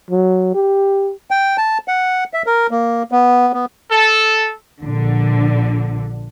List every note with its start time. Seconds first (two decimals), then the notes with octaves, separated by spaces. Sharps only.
0.11 F#3
0.55 G4
1.31 G5
1.58 A5
1.88 F#5
2.33 E5
2.46 A#4
2.71 A#3
3.12 B3
3.54 B3
3.91 A4
4.83 A#1 D3